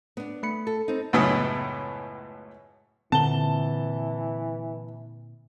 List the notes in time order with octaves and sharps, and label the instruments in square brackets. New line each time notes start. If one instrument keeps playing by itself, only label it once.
[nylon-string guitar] B3 D4
[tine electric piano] A3 B5 C#7
[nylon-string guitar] A4
C4 D#4
[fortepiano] C#2 F#2 A2 B3 B5 D#6
[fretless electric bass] A#2 C4 [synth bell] D3 G7 [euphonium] E3 [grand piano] A5